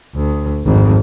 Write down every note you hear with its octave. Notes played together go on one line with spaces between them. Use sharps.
D2
G#1 F2